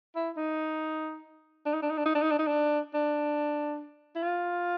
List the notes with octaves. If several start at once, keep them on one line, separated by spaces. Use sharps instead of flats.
E4
D#4
D4
D#4
D4
D#4
D4
D#4
D4
D#4
D4
D#4
D4
D4
E4
F4